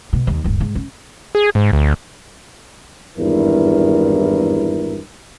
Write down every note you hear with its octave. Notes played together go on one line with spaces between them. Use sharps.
B2
D#2
D1 G1
G#2
C#4
G#4
G#2
D2
G#1 E2 G2 E4 A#4